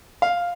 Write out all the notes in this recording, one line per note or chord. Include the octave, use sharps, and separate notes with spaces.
F5